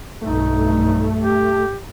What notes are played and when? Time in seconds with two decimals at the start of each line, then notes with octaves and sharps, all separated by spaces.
0.22 B1 G2 A3 D#4
1.19 G4